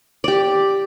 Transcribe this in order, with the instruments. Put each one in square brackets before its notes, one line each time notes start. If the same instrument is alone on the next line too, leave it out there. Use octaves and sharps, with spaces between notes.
[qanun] G4 D5